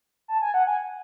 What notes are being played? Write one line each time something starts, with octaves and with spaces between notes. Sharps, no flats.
A5
G#5
F#5
G#5